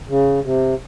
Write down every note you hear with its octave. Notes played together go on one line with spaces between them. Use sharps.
C#3
C3